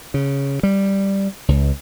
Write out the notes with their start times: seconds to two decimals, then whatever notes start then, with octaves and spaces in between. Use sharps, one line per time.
0.14 C#3
0.63 G3
1.48 C#2